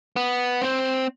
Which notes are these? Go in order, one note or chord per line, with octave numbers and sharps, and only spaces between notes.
B3
C4